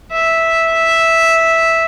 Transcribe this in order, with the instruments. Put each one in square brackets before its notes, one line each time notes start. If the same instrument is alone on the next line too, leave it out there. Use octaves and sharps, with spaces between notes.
[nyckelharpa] E5